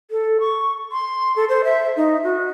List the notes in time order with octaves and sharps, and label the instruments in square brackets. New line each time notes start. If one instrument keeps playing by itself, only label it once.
[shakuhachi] A4
C#6
C6
A4
C5
E5
D#4
F#4